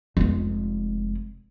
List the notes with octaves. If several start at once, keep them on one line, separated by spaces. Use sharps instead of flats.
F1 G#3